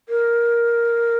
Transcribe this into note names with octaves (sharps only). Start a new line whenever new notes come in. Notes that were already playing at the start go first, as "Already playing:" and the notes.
A#4